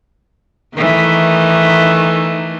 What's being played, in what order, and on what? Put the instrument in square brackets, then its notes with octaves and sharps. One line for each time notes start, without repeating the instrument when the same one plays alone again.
[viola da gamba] D#3 E3 A3